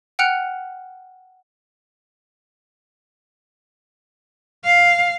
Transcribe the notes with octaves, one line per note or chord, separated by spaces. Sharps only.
F#5 G5 F6 F#6 C#7 F7
F5